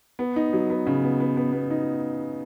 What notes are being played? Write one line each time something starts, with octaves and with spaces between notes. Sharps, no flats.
B3
D#4
F#3
B3
C#3
B3
B3
B3
B3
D#4